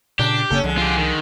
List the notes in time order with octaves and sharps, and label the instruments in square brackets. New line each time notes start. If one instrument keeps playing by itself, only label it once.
[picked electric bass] A#2 C#3 [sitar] D4 [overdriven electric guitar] G4
[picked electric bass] F#1 C#3 A#3 [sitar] C#4 A4
[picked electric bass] C2 F3 [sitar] D3 G#3
[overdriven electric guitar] F4 G4
D#3